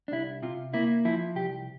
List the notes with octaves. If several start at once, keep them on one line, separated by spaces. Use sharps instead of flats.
D4
C2 E4
C3 F4
A#3 E4
F3 E4
C2 G4